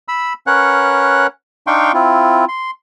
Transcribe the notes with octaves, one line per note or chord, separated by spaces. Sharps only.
B5 E6
C#4 A#4 B4 C#5 F#5 F#6
D4 D#4 F5 G5 C6 C#6
C4 E4 F4
C6